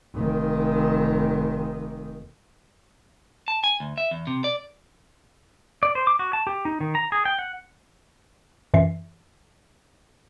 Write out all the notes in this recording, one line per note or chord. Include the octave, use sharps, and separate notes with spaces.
F1 D#3
A5
G#5
D2
E5
E2
C3
D5
D5
C5
D6
F#4
A5
G4
D#4
D#3
A#5
G#4
G5
F#5
F#2 E3 F4 E5 C7